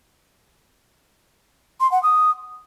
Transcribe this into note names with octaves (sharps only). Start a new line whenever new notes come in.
C6
F#5
D#6